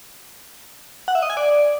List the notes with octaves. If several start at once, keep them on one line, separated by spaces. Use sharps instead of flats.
F#5
E5
D#5
G#5
D5